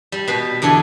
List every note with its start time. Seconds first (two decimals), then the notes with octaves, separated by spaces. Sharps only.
0.12 G3
0.28 B2 B4
0.62 E2 D3 A4 G#5